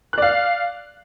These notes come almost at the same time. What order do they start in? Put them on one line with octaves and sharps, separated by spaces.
F#6 D5 F5